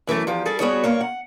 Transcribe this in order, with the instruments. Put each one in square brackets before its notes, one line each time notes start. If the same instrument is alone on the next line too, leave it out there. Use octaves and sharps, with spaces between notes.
[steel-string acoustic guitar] F#2 E3 G#3 A3
E2 F3 G4
G3 G#4 A4
G3 B3 F#4 G#4 C#5
G2 A#3 C#5
F#5